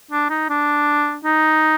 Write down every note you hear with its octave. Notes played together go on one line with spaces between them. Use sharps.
D4
D#4
D4
D#4